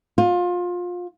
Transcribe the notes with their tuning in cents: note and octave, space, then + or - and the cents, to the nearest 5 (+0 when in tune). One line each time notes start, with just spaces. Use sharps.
F4 +25